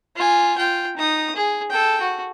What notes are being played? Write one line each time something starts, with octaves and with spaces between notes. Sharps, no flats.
F4 G#5
F4 G5
D#4 D#6
G#4
A4 G5
F#4